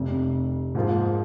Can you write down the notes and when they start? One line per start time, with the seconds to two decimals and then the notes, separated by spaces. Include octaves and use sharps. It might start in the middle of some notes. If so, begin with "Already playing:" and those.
Already playing: F1 F2 C3
0.75 G#2 F3 A#3 F4 G#4